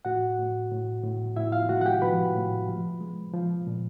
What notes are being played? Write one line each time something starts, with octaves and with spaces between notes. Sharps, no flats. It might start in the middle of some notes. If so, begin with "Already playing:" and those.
A2 F#4 F#5
A2
A2
A2
A2 E4 E5
F4 F5
G#3 F#4 F#5
F#5
G4 G5
F3 B4 B5
A2
F3
G#3
F3
A#2